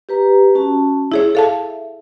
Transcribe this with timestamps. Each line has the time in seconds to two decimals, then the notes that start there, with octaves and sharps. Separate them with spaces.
0.09 G4 B4 A#5
0.55 C#4 F#4 A5
1.12 E4 G#4 C#5 E5
1.35 A4 F5 A5